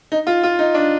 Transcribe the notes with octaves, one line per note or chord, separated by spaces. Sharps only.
D#4
F4
F4
D#4
D4